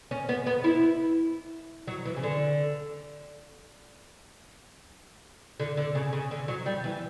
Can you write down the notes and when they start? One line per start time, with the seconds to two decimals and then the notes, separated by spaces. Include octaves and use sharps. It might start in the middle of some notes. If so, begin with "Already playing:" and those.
0.11 C#4
0.29 B3
0.46 B3
0.64 E4
1.87 F#3
2.06 E3
2.16 C#3
2.23 D3
5.60 D3
5.77 D3
5.95 C#3
6.13 C#3
6.31 D3
6.48 F#3
6.66 G3
6.84 E3